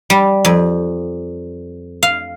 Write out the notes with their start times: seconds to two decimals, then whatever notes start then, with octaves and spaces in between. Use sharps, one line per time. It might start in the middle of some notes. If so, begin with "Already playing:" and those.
0.10 G3
0.45 F2
2.03 F5